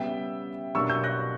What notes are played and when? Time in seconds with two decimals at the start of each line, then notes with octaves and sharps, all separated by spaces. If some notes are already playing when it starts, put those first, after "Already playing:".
Already playing: C#3 G3 B3 E5 G5
0.75 B2 F#3 A#3 D4 G4 C#6 E6
0.89 E6 G6
1.04 F#6 A#6